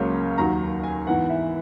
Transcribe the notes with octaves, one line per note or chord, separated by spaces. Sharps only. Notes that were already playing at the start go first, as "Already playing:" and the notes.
Already playing: C#2 C#3 F#3 A#3 C#4
D#2 D#3 F#3 A#5
G#5
G#2 E3 B3 F#5
E5